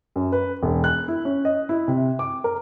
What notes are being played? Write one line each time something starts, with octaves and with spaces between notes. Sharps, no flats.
F#2
B4
E1
F#6
E4
C#4
D#5
E4
C3
D6
A#4